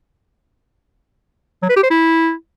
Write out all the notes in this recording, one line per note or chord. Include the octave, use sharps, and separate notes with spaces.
F#3
B4
G4
C5
E4